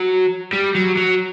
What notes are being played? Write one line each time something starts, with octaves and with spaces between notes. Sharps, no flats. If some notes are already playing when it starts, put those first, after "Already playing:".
Already playing: F#3
G3
F#3
F#3